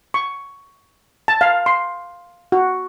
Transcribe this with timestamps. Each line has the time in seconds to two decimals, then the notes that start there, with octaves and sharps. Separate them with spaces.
0.14 C#6
1.28 A5
1.41 F5
1.66 C6
2.52 F#4